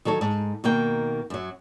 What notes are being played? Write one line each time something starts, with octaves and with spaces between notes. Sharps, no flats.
D#3 F#3 A4 C#5
G#2
B2 D#3 A#3 G5
F#2 F#3